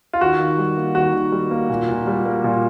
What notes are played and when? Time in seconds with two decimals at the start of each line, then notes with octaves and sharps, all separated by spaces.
0.13 F4
0.21 D#3 F#4
0.39 D#3
0.58 G3
0.77 A#3
0.95 D#3 F#4
1.13 D#3
1.32 G3
1.51 A#3
1.69 A#2
1.89 A#2
2.07 G3
2.26 A#3
2.44 A#2